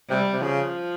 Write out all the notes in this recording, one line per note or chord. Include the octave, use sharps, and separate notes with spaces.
C3 G3
C3
C#3 F3